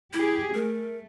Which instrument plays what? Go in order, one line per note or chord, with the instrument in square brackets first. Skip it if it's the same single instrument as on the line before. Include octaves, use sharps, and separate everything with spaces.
[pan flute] E4 [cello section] G4 G#4
[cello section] A3 [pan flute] A#4